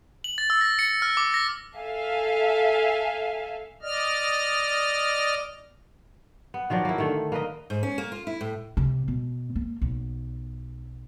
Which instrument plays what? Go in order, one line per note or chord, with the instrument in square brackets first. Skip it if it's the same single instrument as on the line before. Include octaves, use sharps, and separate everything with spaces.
[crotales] F#7
A6
E6
A#6
C#7
F6
D6
A#6
[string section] A4 E5 F5 G#5
[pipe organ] D5 D#5 F6
[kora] B3
D#3 F3 F#3 D5
A#3 E4
D3 D#3 A3
A#3 B4 D#5
[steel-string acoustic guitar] G#2
C#4
A#3
F4
E4
A2
[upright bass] C3
B2
A#3
B1